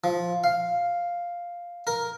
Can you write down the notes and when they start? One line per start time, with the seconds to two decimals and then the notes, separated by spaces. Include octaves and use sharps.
0.04 F3
0.44 F5
1.87 A#4